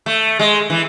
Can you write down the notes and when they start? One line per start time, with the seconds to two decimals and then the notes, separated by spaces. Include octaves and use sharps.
0.06 A3
0.39 G#3
0.70 E3